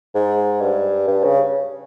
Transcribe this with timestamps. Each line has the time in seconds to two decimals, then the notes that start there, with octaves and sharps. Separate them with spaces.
0.15 G#2
0.61 G2
1.07 G2
1.24 C#3